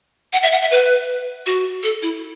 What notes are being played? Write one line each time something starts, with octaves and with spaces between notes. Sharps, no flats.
F#5
E5
F#5
E5
B4
F#4
A4
E4